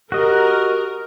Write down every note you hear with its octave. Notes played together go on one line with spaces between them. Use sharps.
F#4 G4 A#4 D#5